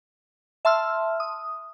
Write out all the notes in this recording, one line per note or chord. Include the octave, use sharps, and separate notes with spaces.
E5 A5 C6 E6 F6
D#6